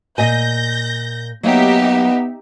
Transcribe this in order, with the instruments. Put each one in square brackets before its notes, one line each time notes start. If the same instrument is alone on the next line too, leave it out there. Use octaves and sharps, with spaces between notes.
[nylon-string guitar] A#2 D#5 G#5 [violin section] G6 A#6
[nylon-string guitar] F#3 A#3 D#5 [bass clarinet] B3 [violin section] D#4 G4 E5